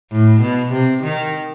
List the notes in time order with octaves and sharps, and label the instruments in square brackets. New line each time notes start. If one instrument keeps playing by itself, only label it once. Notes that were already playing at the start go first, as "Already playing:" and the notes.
[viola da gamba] A2
B2
C3
D#3